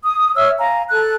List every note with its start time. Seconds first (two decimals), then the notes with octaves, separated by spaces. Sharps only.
0.03 D#6
0.35 C#5 E5 E6 F6
0.59 F5 G#5 A#5
0.90 A4 F#6